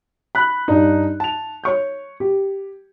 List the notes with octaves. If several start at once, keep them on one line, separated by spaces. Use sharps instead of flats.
B5 F#6
G2 D4 D#4
A5 F7
C#5 C#6 G6
G4